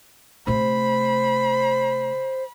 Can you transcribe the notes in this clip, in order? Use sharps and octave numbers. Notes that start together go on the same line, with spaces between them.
C3 A3 C5 B5